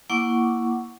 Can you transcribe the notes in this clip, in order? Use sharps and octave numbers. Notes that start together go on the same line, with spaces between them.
A#3 E4 F#5 C#6 D6